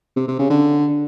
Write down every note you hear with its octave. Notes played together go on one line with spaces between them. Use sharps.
C3
C3
C#3
D3